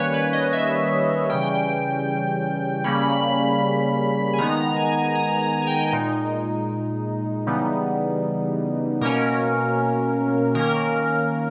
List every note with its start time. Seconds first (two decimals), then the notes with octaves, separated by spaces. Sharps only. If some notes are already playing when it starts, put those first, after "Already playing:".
Already playing: D#3 G3 A#3 C#4 B4 C#5
0.14 B4
0.33 D#5
0.53 E5
1.29 C#3 E3 G3 C#4 G5
2.84 C#3 G3 A#3 C#4 B5
4.33 G#5
4.38 D#3 G#3 B3 D#4 A#5
4.76 G#5
5.15 A#5
5.41 A#5
5.62 G#5
5.67 G5
5.92 A#2 G#3 D#4
7.46 C#3 E3 G3 B3 D#4
9.01 B2 A#3 C#4 A#4
10.55 D#3 A#3 C#4 A#4